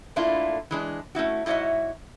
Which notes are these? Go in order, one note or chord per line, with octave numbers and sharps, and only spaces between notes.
A3 A#3 D4 E4 F4
E3 G#3 D4
A3 C#4 E4 F#4
G#2 E4 F#4 C#5 D#5 E5